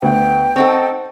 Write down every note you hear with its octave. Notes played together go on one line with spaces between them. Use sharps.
D2 B3 F#5 G5
C4 D#4 A4 C5 F#5 C#6